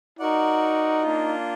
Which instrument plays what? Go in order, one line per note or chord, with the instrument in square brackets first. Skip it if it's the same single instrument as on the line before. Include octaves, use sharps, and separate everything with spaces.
[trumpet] D#4 [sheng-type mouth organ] F#4 A#4 D5 F#5
[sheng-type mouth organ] A#3 D4 F4